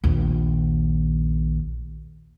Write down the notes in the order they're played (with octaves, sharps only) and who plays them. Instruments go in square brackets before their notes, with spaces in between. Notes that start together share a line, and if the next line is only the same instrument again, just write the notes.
[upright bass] A#1 D#2